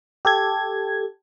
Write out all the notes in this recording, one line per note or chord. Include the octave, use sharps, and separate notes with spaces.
G4 A4 G#6